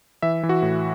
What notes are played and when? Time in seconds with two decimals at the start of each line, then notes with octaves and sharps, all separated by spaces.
0.22 E3 E5
0.43 E3
0.49 F#4
0.62 A2